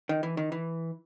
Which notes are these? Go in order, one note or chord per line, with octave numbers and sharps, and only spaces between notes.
D#3
E3
D#3
E3